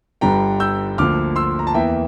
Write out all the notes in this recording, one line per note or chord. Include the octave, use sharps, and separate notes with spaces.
G1 G2 D3 G3 G5 A#5
E6 G6
D2 D3 F3 A#3 D6 F6
C6 E6
A#5
A5
E2 E3 A#3 E5 G5